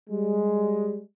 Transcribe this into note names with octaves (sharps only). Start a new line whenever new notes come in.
G3 G#3